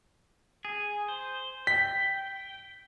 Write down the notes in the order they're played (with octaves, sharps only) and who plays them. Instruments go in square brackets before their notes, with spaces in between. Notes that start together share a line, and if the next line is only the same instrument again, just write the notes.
[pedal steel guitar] G#4
C5
[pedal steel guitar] G5 [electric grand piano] B6